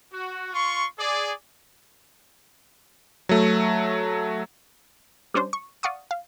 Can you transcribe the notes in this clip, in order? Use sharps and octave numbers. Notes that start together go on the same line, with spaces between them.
F#4
F4 C6 C#6
G#4 D5
F#3 A3
G3 C#4 D4 C5
C#6
D5 F5 F#5 C#6 D#6
F5